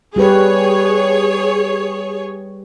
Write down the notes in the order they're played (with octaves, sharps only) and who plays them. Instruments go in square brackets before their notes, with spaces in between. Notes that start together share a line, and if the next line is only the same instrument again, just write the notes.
[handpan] G3 G4 B4 [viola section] G#4 C#5